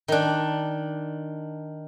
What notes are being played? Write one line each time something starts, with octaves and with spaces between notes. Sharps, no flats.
D#3 D4